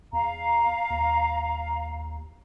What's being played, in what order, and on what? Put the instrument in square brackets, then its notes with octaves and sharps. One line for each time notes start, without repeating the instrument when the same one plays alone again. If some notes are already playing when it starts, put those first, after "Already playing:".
[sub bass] E2 [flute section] F5 A#5
[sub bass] D#2